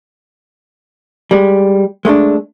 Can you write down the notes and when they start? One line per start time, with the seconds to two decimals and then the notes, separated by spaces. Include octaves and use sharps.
1.31 G3 G#3
2.05 G#3 A3 C#4 D4